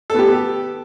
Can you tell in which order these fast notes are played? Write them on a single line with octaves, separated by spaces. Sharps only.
A4 B3 G4